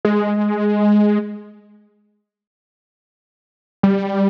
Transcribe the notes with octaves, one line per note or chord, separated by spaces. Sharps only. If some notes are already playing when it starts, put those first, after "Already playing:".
G#3
G3